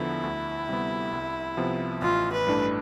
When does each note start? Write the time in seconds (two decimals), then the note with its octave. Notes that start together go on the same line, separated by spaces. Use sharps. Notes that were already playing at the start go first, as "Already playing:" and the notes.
Already playing: E2 D3 F3 B3 E4
0.23 D2
0.68 C3 G3 B3
1.13 C2
1.57 C3 F3 B3
2.02 A1 F4
2.32 B4
2.47 G2 E3 A3 D4